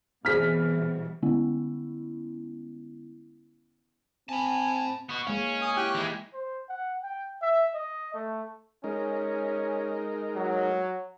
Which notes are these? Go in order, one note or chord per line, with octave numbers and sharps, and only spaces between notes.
B2 E3 G3 C4 G#4 F6 B6
D3 G3 G#3 B3 C#4 E4
C4 G#5 A5 B5
B3 F#4
G#3 A#3 C#4 F5
G#5 D#6
E4 G4 G5 F#6
E3 G#3
C5
F#5
G5
E5
D#5
A3
G#3 C#4 D#4 A#4
F#3